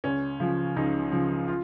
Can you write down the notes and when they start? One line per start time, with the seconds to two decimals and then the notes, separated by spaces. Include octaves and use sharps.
0.04 C#2 C#4
0.40 C#3 F3
0.76 C#2 D#4
1.12 C#3 F3
1.48 F4